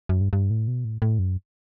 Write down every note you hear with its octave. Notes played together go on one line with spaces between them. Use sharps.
F#2
G2
G2
A2
B2
A2
A2
F#2